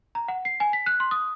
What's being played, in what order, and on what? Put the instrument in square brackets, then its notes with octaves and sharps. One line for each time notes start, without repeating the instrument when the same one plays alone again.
[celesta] A#5
F#5
C7
G#5
B6
F#6
C6
D#6